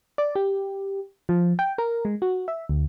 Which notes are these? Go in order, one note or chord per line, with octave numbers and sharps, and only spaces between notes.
D5
G4
F3
G5
A#4
G#3
F#4
E5
D2